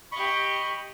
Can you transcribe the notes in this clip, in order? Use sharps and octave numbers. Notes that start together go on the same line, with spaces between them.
G4 D#5 B5 C#6